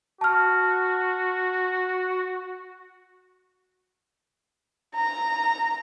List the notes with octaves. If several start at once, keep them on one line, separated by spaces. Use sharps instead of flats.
F#4 A5 F6
A#5